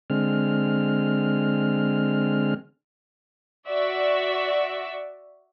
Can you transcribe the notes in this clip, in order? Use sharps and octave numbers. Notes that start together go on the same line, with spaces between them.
D3 G#3 C4 F6
F#4 D5 E5